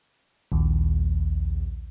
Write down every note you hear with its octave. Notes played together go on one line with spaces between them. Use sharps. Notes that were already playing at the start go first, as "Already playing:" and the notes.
A#1 D#2